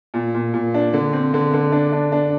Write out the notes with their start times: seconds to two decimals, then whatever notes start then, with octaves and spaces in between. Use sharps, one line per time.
0.14 A#2
0.34 A#2
0.54 A#2
0.74 D4
0.94 D3
1.13 C4
1.34 D3
1.54 D3
1.72 D4
1.92 D4
2.12 D4